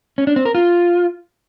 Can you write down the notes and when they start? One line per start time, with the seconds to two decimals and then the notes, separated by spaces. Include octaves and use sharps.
0.18 C#4
0.27 D4
0.36 C4
0.45 A#4
0.55 F4